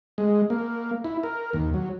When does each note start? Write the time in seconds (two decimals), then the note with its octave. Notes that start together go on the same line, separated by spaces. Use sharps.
0.18 G#3
0.50 A#3
1.04 E4
1.23 A#4
1.53 D#2
1.74 F#3